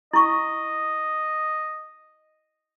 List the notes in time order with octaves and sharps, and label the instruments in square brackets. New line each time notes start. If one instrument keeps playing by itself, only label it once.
[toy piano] E4 C#6 [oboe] D#5